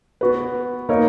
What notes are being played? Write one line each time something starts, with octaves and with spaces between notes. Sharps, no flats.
B3 F#4 B4
A#3 D#4 A#4 C#5